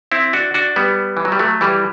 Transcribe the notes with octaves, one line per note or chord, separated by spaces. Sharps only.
C4 E4
D4 F#4
D4 F#4
G3 B3
E3
F#3
G3
F#3 A3
E3 G3